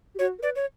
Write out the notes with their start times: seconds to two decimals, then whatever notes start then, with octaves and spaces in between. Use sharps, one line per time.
0.15 G4
0.19 F#4 C#5
0.39 A#4
0.42 B4 D5
0.56 C#5